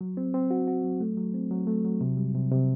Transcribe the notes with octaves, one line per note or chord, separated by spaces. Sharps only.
F#3
C4
C4
F#4
F#4
F#3
A3
F#3
C4
F#3
A3
F#3
C3
G3
C3
C3